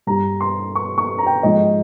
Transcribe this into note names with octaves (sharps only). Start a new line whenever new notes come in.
G2 G3 A#5
C6
C#6
C#6
A#5
G5
G#2 F3 G#3 D#5